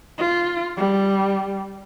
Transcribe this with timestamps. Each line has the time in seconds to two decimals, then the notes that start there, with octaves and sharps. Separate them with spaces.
0.19 F4
0.77 G3